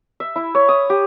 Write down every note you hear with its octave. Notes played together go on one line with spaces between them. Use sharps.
E5
E4
C#5
D#6
G4